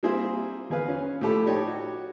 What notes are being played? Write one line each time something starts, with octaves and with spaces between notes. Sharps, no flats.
G3 A#3 C4 E4 G#4 C5
E2 G#4 B4 F5
C#4
A2 F3 G4 A4 B5
D#4 G4 C#5 D5 G5
F#4